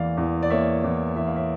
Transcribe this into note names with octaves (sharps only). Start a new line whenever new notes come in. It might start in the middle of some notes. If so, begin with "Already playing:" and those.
Already playing: E2 E3 A#3 D5 F5
E2
D5
A#3 C#5 E5
E2
E3 E5
F5
C#5 E5